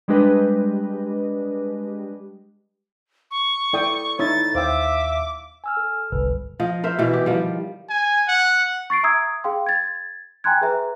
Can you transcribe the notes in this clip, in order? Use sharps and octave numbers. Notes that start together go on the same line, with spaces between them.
G3 G#3 D4 G4 B4 D#5
C#6
E4 A4 D5 G5 D#6
D#4 E4 C#5 A6
D#2 C5 E5 F5 G5 D6 E6
G#5 E6 F6
A4
G1 C2 B4
F3 D#5
A#4 C5 E5
B2 E3
G4
D#3 F3 G3
G#5
F#5
C#6 A6 C7 D7
E5 A#5 D#6 E6 G#6
G#4 F5 G5 C6
G#6 A6
G5 G#5 A#5 C6 F#6 G#6
G#4 B4 E5 A#5